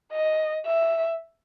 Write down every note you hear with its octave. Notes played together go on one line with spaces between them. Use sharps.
D#5
E5